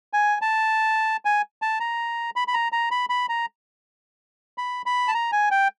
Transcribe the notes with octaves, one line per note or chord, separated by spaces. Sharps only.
G#5
A5
G#5
A5
A#5
B5
B5
A#5
A#5
B5
B5
A#5
B5
B5
A5
A#5
G#5
G5